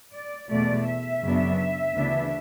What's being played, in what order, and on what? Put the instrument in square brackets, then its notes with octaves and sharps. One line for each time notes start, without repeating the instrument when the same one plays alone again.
[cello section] D5
E2 B2 A3 D5
E5
F#2 C#3 F#3 B3 D4
D2 C#3 E3 B3 D4